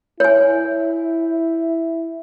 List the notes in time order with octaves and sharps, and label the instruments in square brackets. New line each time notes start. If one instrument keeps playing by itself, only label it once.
[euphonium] E4 [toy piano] C#5 G#5